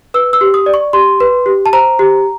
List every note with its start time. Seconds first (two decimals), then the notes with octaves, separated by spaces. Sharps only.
0.14 B4 E6
0.33 E6
0.41 G4
0.54 D#6
0.66 D5
0.74 C#6
0.93 G4 C6
1.20 B4
1.46 G4
1.66 A5
1.73 C5 A#5
1.99 G4